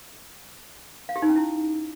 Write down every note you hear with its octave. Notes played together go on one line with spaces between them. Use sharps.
F5
G4
D#4
C#4
E4